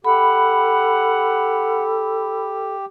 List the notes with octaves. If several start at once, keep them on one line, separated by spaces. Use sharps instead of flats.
G4 A4 F#5 B5